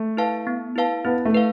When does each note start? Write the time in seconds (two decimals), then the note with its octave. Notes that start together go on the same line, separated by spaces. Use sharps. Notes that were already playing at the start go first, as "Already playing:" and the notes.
Already playing: A3
0.17 E4 B4 F5 A5
0.47 B3
0.76 E4 B4 F5 A5
1.05 B3 E4
1.25 A3
1.34 B4 F5